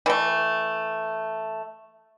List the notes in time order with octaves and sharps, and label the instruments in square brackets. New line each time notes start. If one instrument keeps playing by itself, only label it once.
[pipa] E3 A3